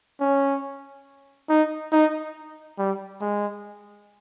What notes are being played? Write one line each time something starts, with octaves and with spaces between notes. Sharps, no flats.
C#4
D#4
D#4
G3
G#3